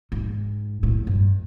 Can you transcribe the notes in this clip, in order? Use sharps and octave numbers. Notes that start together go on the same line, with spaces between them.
G#2
A2
G2